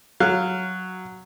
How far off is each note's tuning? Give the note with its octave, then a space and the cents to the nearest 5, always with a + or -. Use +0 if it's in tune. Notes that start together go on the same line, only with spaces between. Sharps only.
F#3 +0 F5 +0